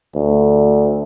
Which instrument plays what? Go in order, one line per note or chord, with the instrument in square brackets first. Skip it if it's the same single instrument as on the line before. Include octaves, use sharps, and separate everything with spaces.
[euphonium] D2